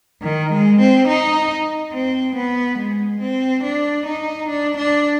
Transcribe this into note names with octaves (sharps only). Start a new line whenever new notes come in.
D#3
G#3
C4
D#4
C4
B3
G#3
C4
D4
D#4
D4
D4